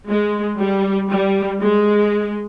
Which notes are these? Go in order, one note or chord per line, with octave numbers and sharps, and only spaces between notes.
G#3
G3
G3
G#3